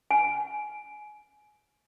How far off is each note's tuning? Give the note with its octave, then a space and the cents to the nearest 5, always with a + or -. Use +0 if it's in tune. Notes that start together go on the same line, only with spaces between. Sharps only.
G#5 +20